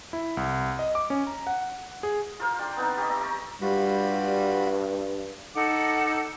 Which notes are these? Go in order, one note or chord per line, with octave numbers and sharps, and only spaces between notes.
E4
C2
D#5
D6
C#4
A#5
F#5
G#4
F4 A#4 C5 F5
D4 D5 G5
B3 C4 D#4 A5
G4 C#5 D#5
D5 E5 A#5
A#5 C#6
G2 G3 F4 F#4 B5
D#4 A4 F#5 D6